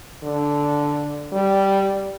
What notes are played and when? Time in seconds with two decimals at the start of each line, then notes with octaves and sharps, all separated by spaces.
0.23 D3
1.32 G3